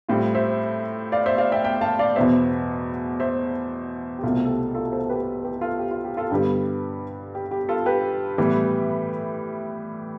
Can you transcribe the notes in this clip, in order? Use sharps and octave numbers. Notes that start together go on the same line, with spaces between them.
A2 G3 C4 F4
C5 E5
D5 F5
C5 E5
D5 F5
E5 G5
E5 G5
F5 A5
D5 F5
E2 B2 B3 C5 E5
C5 E5
G4
C2 B2 A3 C4 F4 A4
A4
G4
F4 A4
A4 C5
G4 B4
G4 B4
F4 A4
G4
F4
G4
F4 A4
G2 D3 G3 B3 G4
G4
G4
F4 A4
G4 B4
A2 E3 G3 B3